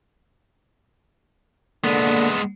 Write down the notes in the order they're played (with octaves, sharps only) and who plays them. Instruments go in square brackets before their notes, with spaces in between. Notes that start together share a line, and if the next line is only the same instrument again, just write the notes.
[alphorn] D3 [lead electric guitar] G#3 B3 [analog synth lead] A#3